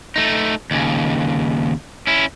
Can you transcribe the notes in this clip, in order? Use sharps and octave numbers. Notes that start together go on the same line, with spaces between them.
A3 D#4
D#2 C#3
C#4 E4